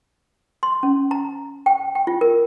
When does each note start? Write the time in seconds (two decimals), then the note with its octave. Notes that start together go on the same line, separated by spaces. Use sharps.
0.63 C6
0.83 C#4
1.11 A#5
1.66 G5
1.95 G5
2.07 F4
2.21 A#4